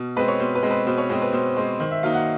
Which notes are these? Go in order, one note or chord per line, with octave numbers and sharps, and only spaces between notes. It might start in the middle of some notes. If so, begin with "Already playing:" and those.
Already playing: B2
G#3 C4 B4
C#5
B2 C5
B4
G#3 C4
B4
B2 C5
C#5
G#3 C4 C5
B4
B2 C5
G#3 C4
D#3 C5
E5
F#3 A#3 D#4 F5
F#5